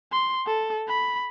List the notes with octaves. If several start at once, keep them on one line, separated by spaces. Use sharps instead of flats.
C6
A4
B5